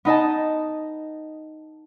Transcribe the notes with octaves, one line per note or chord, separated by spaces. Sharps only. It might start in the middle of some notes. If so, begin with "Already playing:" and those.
B3 D#4 D#5 A5